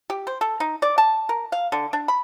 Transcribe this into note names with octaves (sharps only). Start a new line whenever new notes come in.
G4
C5
A4
D#4
D5
A5
A#4
F5
D3
D4
B5